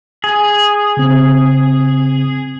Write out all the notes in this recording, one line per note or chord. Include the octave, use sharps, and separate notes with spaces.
G#4
C#3 C4